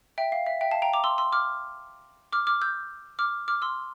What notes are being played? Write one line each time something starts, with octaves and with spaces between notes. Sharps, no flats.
E5 G5
F5
E5
E5 G5
F5 A5
G5 A#5
A#5 D6
C6 E6
C6 E6
D6 F6
D6 F6
D6 F6
E6 G6
D6 F6
D6 F6
C6 E6